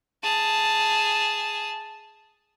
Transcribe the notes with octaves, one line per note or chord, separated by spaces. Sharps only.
G#4 A5